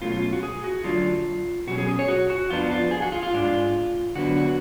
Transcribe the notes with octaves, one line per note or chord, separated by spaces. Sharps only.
B2 F#3 A3 C#4 F4
F4
F4
F#4
G#4
F#4
D3 F#3 A3 D4 F4
B2 F#3 C#4 F#4
G#4
G#4
C#5
F#4
F#4
F2 F3 B3 D4 F4
F4
G#4
F#4
F4
F4
G#2 G#3 D4
D3 F#3 B3 D4 F#4
F#4